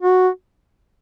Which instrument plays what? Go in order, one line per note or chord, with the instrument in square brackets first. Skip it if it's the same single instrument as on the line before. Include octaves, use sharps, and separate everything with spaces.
[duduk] F#4